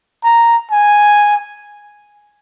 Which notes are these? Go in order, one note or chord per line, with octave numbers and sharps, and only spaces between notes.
A#5
G#5